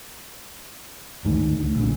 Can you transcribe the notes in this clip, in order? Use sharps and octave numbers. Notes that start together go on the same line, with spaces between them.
D2 G#2 D#3
D2
B1 A#2 D3